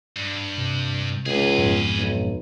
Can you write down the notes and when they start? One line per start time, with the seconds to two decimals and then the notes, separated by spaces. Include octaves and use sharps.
0.16 G2
0.58 C3
1.26 C#2 G#4 B4
1.58 F2 G#2 B3
1.98 B1